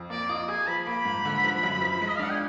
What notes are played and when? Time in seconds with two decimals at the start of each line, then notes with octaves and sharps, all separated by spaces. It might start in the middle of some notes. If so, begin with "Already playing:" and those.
Already playing: F2
0.10 A#3 D5
0.29 F4 D#5
0.48 G#4 G#5
0.67 F3 B5
0.86 A#3 B5
1.05 G#2
1.25 D3
1.44 F3
1.63 F#2
1.82 F3
2.01 G#3
2.08 D#5
2.15 F5
2.19 D4 F#5
2.31 G#5